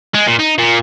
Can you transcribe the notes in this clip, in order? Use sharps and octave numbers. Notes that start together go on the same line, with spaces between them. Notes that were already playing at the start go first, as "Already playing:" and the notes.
G#3
A#2
D#4
A#2